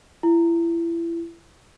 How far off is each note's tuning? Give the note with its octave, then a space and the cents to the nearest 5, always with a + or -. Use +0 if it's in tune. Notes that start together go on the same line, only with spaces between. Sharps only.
E4 +30